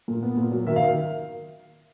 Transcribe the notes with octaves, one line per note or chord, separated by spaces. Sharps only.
A#2
B3
A#2
F#3
D#3 E5
F5
D#3